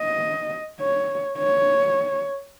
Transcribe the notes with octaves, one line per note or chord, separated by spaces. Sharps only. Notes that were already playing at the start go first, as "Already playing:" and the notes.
Already playing: D#5
C#5
C#5